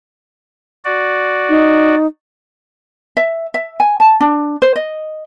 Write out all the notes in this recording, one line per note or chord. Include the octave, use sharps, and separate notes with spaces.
F#4 D5
D#4
E5
E5
G#5
A5
D4
C5
D#5